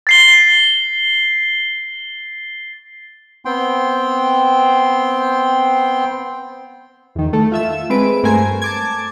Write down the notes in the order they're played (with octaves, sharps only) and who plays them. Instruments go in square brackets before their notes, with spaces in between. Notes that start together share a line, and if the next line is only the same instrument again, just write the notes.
[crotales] A6 C7 G7
[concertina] B3 C4 G5 C6
[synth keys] E2 D#3
A3
F4 E5 E6
G#3 C4 B4 D7
G2 A3 A#4 C5 G#5 G#6
A5 D6 G#6